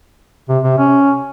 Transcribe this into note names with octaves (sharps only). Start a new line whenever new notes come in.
C3
C3
C#4